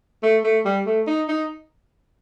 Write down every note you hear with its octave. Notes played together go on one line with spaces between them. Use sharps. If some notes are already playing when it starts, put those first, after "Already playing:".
A3
A3
G3
A3
D#4
D#4